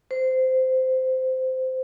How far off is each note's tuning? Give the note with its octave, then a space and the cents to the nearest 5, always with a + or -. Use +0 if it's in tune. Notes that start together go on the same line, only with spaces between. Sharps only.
C5 -15